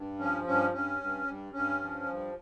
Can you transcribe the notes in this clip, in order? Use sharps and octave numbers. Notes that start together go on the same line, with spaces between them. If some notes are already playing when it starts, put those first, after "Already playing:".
Already playing: G2
F3 C#4
G2 C#4
G2 C#4
G2
G2
G2 C#4
F3
G2